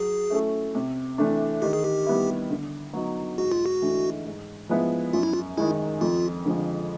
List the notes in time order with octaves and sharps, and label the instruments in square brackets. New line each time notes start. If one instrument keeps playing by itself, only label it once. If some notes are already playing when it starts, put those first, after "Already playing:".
Already playing: [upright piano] F#3 [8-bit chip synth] G#4
[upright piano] A3 C#4 E4 A4
C3
E3 A3 D4
[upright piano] D#3 [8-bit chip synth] G4
[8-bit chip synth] G#4
G4
[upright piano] G3 B3 E4
D3
F#3 B3 D#4
[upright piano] G#2 [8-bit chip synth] F#4
[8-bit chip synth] F4
F#4
[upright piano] E3 A3 D4
G#2
F3 G#3 B3 E4
[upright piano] F#2 [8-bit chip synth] F4
[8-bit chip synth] E4
F4
[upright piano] D#3 G#3 [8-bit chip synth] E4
[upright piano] F2 [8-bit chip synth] F4
[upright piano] D3 F3 G#3